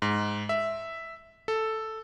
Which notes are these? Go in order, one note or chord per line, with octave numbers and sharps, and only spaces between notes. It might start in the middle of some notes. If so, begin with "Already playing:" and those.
G#2
E5
A4